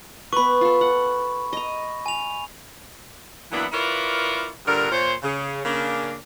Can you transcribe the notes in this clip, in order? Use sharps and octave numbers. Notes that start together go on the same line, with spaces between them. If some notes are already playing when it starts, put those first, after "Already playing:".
B3 B4 B5 C#6
F4 A4
F#5
D#5 A#5
G#5 F7
E3 F#3 A#3 B3 D4 E4
E4 F4 A#4 B4 C#5 D5
G2 A#2 D3 A#4
A#2 C5 C#5
C#3
C#3 A#3 D4